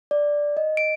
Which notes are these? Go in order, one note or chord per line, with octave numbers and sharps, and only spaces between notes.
D5
D#5
D7